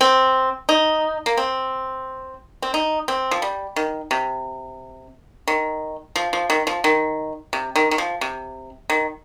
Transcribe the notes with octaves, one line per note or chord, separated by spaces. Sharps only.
C4
D#4
A#3
C4
C4
D#4
C4
F3
G3
D#3
C3
D#3
F3
F3
D#3
F3
D#3
C3
D#3
D#3
F3
C3
D#3